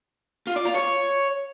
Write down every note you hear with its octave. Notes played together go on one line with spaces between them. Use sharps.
F4
D5
F4
C#5